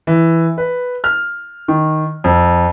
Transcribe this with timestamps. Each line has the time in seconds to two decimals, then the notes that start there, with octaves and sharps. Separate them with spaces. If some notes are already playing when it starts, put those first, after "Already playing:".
0.07 E3
0.58 B4
1.04 F6
1.68 D#3
2.24 F2